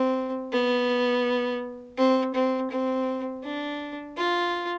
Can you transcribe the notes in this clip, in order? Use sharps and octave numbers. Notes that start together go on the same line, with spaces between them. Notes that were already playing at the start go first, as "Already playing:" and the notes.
Already playing: C4
B3
C4
C4
C4
D4
F4